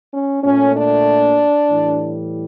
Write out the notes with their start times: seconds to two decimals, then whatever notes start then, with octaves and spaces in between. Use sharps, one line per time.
0.13 C#4
0.44 A#2 A3 C#4
0.75 D4
1.69 A2 E3 G3